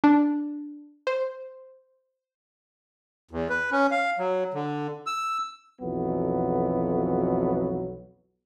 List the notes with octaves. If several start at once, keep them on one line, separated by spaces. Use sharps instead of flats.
D4
C5
E2
B4
C#4
F5
F#3
D3
E6
B1 F2 E3 F#3 B3